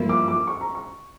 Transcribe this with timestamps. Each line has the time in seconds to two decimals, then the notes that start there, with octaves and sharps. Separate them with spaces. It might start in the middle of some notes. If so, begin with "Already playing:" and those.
Already playing: G2 F3 A#3 E4
0.09 D6
0.28 D6
0.47 C#6
0.61 A#5
0.75 C#6